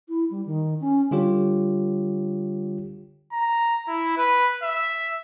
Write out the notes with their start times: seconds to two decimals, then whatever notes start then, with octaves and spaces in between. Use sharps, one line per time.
0.09 E4
0.30 G3
0.46 D#3
0.80 C#4
1.11 D3 G3 F4 G4 C#5
3.33 A#5
3.88 E4
4.17 B4
4.63 E5